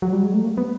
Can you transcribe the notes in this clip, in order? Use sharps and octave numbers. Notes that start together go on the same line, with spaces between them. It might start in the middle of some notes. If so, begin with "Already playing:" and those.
F#3
G3
G#3
A3
A#3
B3